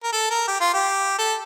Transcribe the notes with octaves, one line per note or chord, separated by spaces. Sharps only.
A#4
A4
A#4
G4
F4
G4
A4